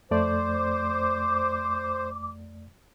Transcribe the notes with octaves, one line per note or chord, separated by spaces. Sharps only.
F2 A3 C5 D5 D6